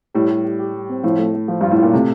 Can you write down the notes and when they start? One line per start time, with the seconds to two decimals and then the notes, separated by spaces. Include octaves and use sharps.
0.14 A2 G3
0.30 G3
0.44 G3
0.59 G4
0.74 G3
0.89 C4
1.03 A2 F3
1.19 A3
1.34 A3
1.48 F3
1.61 G2 F4
1.71 A2
1.78 A#2 F4
1.93 C3 A3